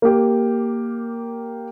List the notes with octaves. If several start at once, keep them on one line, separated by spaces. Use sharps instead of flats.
A#3 G4